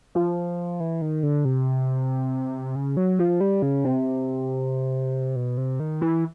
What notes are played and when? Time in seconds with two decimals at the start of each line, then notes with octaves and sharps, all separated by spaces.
0.15 F3
0.80 E3
1.02 D#3
1.23 D3
1.45 C3
2.76 C#3
2.97 F#3
3.19 F3
3.41 G3
3.62 C#3
3.84 C3
5.36 B2
5.57 C3
5.80 D#3
6.01 E3